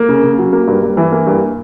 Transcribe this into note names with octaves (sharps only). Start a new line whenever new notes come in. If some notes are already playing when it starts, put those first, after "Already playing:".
Already playing: A#3
C#3
C#3
F#3
A#3
G2
G2
E3
A#3
G2